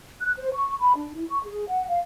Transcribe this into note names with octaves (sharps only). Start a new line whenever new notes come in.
F#6
C5
C#6
B5
D4
E4
C#6
G#4
F#5
F5